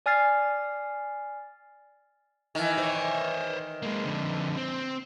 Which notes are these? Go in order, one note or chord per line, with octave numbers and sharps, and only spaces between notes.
D5 G#5 F6 A6 C7
D#3 E3
C5 C#5
G#3 A#3
F2 D3
C4